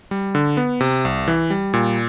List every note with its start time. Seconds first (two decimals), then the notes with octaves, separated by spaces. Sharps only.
0.11 G3
0.35 D3
0.57 B3
0.80 C3
1.05 C2
1.28 E3
1.50 G3
1.74 A#2